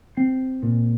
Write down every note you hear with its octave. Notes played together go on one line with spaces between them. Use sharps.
C4
A#2